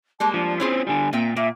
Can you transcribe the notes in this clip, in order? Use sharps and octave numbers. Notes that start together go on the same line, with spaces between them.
G3 G#3 A#3 A5
F3 D4
C4 C#4 E4 F4 G#4 C5
D3 G3 G#5
A#2 A#3 C4 E5 G5
A#2 A#3 E5